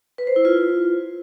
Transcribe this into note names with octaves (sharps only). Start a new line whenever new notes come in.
B4
C5
E4
F4